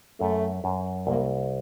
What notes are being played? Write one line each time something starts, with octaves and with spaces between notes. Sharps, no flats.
F#2 A3
F#2
C2 A#3